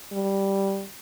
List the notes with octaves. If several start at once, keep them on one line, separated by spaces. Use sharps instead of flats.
G3